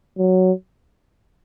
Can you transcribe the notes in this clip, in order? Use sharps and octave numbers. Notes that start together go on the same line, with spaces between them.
F#3